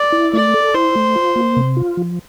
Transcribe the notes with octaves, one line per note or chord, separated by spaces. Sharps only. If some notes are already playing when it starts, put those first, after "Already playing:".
Already playing: D5
E4
A3 D5
A4
E4 C5
A3
F4
A#3
C3
F4
F3